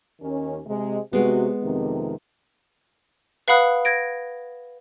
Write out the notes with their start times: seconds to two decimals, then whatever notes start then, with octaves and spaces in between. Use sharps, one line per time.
0.21 D#2 D#3 C#4
0.67 C3 G#3
1.13 C3 G#3 B3 F#4
1.63 F2 C3 D#3
3.48 B4 F5 F#5 B5 D#6 F#6
3.85 G#6 A#6 D7